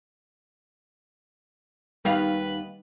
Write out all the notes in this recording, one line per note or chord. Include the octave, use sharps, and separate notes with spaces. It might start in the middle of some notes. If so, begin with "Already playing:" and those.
D#2 G3 B3 D#4 B4 F5